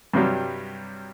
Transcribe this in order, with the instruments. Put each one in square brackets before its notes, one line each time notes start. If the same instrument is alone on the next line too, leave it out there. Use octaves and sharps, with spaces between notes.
[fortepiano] G2 C3 F#3 G3